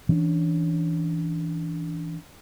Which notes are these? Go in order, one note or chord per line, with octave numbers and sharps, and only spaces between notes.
E3 C#4 D4